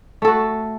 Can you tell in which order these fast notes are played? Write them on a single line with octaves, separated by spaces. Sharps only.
A3 A4 F#4